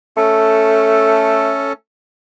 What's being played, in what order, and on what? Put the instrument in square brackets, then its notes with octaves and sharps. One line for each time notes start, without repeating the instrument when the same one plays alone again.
[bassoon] A3 [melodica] C#4 A4